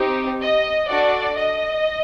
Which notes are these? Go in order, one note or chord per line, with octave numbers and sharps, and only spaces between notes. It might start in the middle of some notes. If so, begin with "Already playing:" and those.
Already playing: C4 D#4 G4
D#5
D4 F#4 A4 D5
D#5